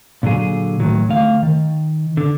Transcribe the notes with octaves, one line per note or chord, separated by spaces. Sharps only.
A#2 D3 F#3 G#4
A2 D#3 F#3
D2 A3 F5
D#3
D3